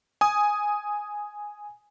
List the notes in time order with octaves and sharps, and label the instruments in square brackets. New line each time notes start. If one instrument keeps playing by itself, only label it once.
[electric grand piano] G#5 D#6